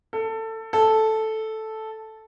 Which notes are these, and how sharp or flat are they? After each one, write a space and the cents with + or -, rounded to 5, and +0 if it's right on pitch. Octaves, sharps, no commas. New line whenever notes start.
A4 +20
A4 -5